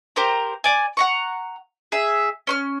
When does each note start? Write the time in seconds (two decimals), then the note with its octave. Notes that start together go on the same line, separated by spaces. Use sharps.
0.16 G4 A#4 C5 A#5
0.64 D5 G#5
0.97 F#5 A#5 C#6
1.92 G#4 E5
2.47 C#4 C#6 F6